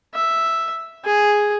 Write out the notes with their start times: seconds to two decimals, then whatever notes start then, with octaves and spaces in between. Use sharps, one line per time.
0.15 E5
1.05 G#4